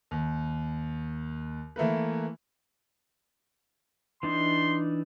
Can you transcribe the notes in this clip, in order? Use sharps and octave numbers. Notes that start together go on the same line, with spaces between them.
D#2
E3 A3 A#3 B4
E3 D4 D#4 C6